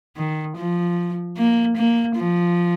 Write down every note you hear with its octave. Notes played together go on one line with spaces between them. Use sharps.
D#3
F3
A#3
A#3
F3